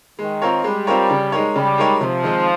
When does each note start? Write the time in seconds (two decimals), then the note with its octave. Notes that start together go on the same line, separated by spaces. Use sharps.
0.19 D#3 G#3
0.42 C4 F4 A#4 C#5
0.64 G3 G#3
0.87 C4 F4 A#4 C#5
1.10 C#3
1.32 G#3 D#4 A#4 C#5
1.55 C#3 G3
1.78 G#3 D#4 A#4 C#5
2.00 C3 F3
2.23 D#3 G#3 C4 D#4